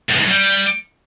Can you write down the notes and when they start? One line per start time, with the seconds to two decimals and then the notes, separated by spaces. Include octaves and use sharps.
0.10 F#2
0.15 E2
0.20 G#2
0.25 F#2
0.31 G3